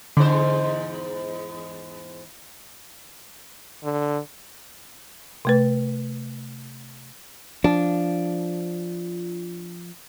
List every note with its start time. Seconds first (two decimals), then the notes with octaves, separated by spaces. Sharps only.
0.17 E2 G#2 D3 C5
3.84 D3
5.45 C3 A3 B4
7.64 F3 D4